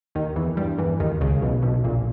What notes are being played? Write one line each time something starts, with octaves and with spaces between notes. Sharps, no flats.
D#2 D#3
E2 E3
G2 G3
E2 E3
D#2 D#3
C#2 C#3
B1 B2
B1 B2
A#1 A#2